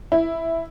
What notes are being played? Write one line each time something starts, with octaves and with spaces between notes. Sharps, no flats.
E4